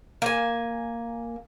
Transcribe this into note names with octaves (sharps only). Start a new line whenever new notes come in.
A#3 G#5